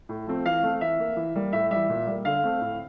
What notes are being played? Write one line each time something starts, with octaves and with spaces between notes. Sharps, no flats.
A2
F3 A3 C4
E3 F5
A3 C4
E3 E5
A#3
E3
G3 A#3
A2 E5
E3 G3 E5
A#2
G3 A#3
D3 F5
A3 C4
A2